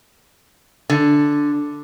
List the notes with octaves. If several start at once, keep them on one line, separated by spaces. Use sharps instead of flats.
D3